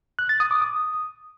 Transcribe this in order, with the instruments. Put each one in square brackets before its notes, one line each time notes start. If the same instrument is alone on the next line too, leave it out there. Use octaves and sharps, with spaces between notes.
[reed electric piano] F#6
A6
D#6
D6
D#6